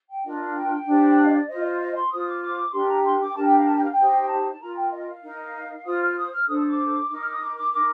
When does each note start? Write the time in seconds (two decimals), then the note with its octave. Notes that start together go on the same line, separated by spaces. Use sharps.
0.08 G5
0.23 D4 F4 A#4 D#5
0.39 F5
0.55 G5
0.86 D4 G4 C5
1.17 F5
1.25 D#5
1.33 D5
1.48 F4 C5 D#5
1.64 D#5
1.79 D#5
1.95 C6
2.10 F4 C5 D#6
2.26 D6
2.41 D6
2.73 D4 G4 A#4 C6
2.88 A#5
3.03 C6
3.19 D6
3.28 G5
3.35 D4 G4 A#4 A5
3.45 G5
3.56 F5
3.66 A5
3.75 G5
3.82 F5
3.91 G5
3.97 D#4 G4 C5
4.28 A5
4.51 A5
4.59 F4 A#4 A#5
4.75 G5
4.90 D#5
5.00 G5
5.06 F5
5.22 D#4 A#4
5.84 F4 C5 D#6
6.00 F6
6.15 D#6
6.31 F6
6.46 D4 A4 C5 D#6
6.57 D#6
6.67 D6
7.09 D#4 A#4
7.20 F6
7.29 D#6
7.40 D6
7.55 D6
7.71 D#4 A#4 D6